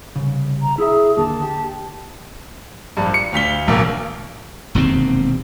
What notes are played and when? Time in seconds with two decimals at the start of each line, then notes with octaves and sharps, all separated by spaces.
0.16 C2 G2 C#3
0.62 A#5
0.78 E4 G#4 E5
1.17 D#2 D3 A#3 A5
1.42 G4
2.97 A#1 G2
3.14 C#7
3.33 D2 F5 B6 G7
3.67 E1 B1 B2 A#3
4.75 E1 D#2 C3 C4